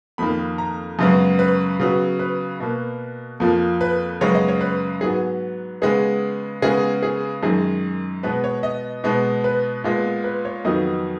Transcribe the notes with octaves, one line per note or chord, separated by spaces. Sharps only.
F2 D#3 A#3 B5
A#5
F#2 C#3 G#3 B3
B4
C#3 F#3 B3
B4
B2 A#3
F2 F3 A#3
B4
F#2 C#3 G#3 B3 C#5
D#5
C#5
B4
G#2 F#3 B3 G#4
C#3 G#3 B3 G#4
C#3 G#3 B3 G#4
G#4
F#2 D#3 G#3 G#4
B2 G#3 B3 B4
C#5
D#5
B2 G#3 B3
B4
A#2 G#3 B3
B4
C#5
F2 D#3 F#3 B3 D#5